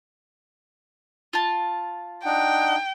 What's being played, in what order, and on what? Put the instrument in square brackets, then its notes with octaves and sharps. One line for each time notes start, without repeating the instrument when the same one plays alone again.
[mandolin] F4 A5
[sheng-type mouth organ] D4 D#4 F#5 [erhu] G5